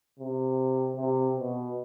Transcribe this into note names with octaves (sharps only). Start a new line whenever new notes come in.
C3
C3
B2